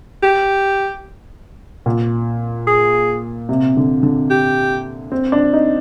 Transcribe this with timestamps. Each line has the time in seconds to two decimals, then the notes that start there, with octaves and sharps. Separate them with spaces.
0.23 G4
1.86 A#2
2.67 G#4
3.49 C3
3.77 D3
4.03 D3
4.30 G4
5.12 C4
5.32 D4
5.53 D#4